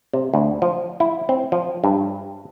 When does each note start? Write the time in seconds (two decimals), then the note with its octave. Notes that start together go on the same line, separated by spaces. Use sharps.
0.13 C3
0.34 D2
0.62 F3
1.00 E4
1.29 C4
1.52 F3
1.84 G2